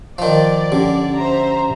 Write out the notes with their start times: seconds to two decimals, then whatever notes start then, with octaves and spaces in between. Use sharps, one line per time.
0.18 D#3 F3 D5
0.72 D3 F3 C#4 G4
1.16 C5 E5 A#5